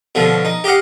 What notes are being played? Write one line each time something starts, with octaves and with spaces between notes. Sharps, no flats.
B2 D3 F3
D#4
G4 D#5 F5 F#5